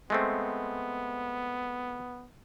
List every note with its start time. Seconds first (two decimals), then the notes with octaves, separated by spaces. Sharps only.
0.10 G#3 A3 B3 C4